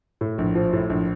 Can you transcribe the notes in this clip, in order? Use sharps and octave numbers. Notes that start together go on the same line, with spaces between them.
A2
A#1
F3
A2
A#1